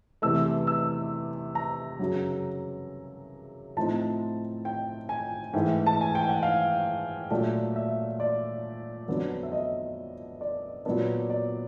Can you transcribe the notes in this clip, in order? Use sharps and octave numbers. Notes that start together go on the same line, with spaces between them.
E2 C3 E3 A3 E6
E6
A#5
F#2 C#3 F#3
A2 F3 A3 C4 D#4 A5
G5
G#5
G#2 E3 A3 G5
A5
G#5
G5
F#5
F5
A#2 F#3 A3 D4
E5
D5
F2 D3 F#3 B3
E5
D#5
D5
A#2 F#3 B3 D4
D5